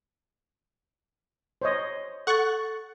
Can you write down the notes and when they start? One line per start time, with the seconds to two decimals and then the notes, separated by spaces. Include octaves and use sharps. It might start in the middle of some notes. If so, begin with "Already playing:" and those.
1.62 C5 C#5 D#5
2.27 A4 F#5 C#6 F#6 A6